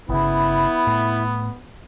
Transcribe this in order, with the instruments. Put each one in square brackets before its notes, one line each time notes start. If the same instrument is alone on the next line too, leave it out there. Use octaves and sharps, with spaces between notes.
[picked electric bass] G1 C#3 [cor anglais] B3 [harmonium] E4
[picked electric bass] A2